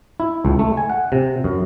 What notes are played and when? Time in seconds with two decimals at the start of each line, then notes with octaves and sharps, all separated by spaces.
0.20 E4
0.45 C#2
0.59 A3
0.77 G#5
0.90 F#5
1.12 C3
1.44 F#2